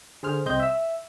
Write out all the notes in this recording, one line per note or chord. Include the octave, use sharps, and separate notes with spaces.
D3 G#4 C5 F6
C2 C4 C5 D#5 G6
E5 E6